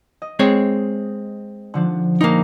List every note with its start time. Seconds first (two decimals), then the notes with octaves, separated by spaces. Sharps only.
0.22 D#5
0.39 G#3 C4 C#5
1.74 D3 F3 D4
2.21 A#1 A#3 D#4